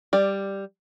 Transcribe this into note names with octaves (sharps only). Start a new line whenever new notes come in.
G3 D5